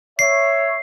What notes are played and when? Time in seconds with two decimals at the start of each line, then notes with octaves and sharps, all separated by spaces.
0.19 C#5 E5 C7